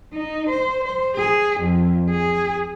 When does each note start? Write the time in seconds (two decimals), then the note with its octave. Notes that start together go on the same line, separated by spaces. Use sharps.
0.14 D#4
0.49 C5
0.84 C5
1.16 G#4
1.61 F2
2.11 G#4